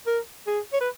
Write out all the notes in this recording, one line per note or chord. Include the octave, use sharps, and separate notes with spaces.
A#4
G#4
C#5
B4